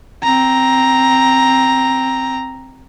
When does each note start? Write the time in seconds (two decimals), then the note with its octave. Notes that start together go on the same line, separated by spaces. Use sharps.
0.23 C4 A#5